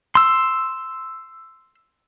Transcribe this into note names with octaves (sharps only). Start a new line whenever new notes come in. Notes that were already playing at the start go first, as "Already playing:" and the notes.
C6 E6